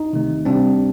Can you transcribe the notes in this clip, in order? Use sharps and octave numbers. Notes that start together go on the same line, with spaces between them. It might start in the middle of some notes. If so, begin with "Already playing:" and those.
Already playing: D#4
C3 D#3 A3
C3 G3 C4 D4